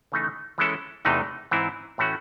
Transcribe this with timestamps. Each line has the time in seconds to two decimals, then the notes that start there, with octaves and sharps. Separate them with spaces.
0.12 C#3 E3 A3 D#4
0.58 E3 G#3 C#4 E4 A4
1.05 E2 C3 E3 A3 D#4
1.51 G#2 E3 C4 E4
1.98 A2 E3 A3 C#4 F#4